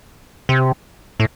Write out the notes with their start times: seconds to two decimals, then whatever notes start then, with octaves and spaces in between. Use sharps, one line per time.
0.49 C3
1.20 A2